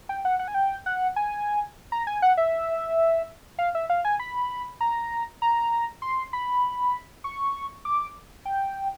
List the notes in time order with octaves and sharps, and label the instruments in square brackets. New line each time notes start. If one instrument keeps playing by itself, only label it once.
[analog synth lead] G5
F#5
F#5
G#5
G5
F#5
G#5
A#5
G#5
F#5
E5
F5
E5
F5
G#5
B5
A#5
A#5
C6
B5
C#6
D6
G5